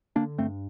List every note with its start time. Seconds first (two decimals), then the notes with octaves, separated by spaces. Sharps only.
0.16 D3 A#3 D4
0.38 G2 A3 C4